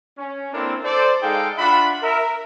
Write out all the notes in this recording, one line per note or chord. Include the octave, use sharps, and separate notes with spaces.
C#4
A#3 C4 D4 E4 A4 A#4
A4 C5 D5
G#3 D#4 G#4 A4 F5 G5
D4 F4 E5 F#5 B5
A#4 E5